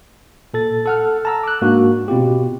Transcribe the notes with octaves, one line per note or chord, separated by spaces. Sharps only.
A#2 A4 A6
A4 F#5 F6
A5 A#5 E6
D6 F#6
G#2 A#3 D4 F#4
B2 C4 F4 G4